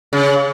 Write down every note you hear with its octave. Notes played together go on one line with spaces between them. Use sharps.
C#3